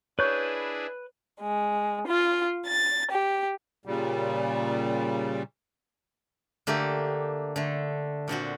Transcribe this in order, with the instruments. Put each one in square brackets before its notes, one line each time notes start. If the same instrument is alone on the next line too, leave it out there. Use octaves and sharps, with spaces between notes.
[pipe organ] D4 E4 G#4 [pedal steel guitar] B4 G6 [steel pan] C#5
[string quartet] G#3
F4
A6
G4
[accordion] A#2 C#3 G3
[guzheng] D3 A3 A#3 G4
D3 A3
A#2 D3 C4 F#4